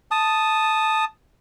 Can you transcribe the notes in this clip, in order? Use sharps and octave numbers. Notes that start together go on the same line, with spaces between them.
A5 D#6